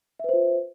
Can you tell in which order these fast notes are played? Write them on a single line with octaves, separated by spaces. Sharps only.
E5 B4 C5 F4